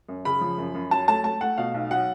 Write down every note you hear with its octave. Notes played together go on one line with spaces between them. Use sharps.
F#2
C#3 B5
F3
F#2
F#2
F#3 A5
A3 A5
A3 A5
A3 F#5
B2 F5
B1
F#3 F#5